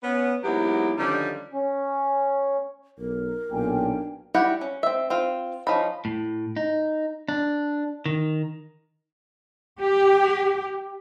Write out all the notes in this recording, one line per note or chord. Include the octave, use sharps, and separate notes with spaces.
B3 C#4
G#2 F#3 A#3 B3 E4 G4
D3 D#3 F3 G3 C#4 D4
C#4
B1 A#4
B1 A#2 D4 G5 G#5
G3 E4 F#4 G4 F#5
C#4
C4 E5
C4 F4
F3 C#4 D#4 B5
A2
D#4
D4
D#3
G4